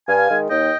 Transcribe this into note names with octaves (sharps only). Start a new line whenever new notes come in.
G2 F5 G#5
D#3 G#3
D#2 D#5 G5